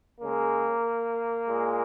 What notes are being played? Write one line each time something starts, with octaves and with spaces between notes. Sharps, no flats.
C#3 G#3 A#3
A#2 G#3